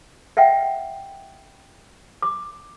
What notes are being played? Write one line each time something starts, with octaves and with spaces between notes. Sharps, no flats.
D#5 E5 F#5 G5
D6